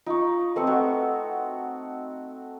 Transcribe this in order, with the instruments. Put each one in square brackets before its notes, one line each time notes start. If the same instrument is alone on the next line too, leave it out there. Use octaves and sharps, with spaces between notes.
[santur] D#4 [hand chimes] F4 C#6
[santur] A3 C4 C#6 [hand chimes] A4 B4 D#5
[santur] F#4 [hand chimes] D#5 F#5